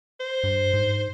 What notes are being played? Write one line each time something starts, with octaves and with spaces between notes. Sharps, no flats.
C5
G2
G#2